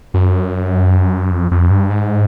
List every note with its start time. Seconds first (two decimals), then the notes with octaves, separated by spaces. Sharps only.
0.14 F#2
1.31 F2
1.51 F2
1.70 G2
1.90 G#2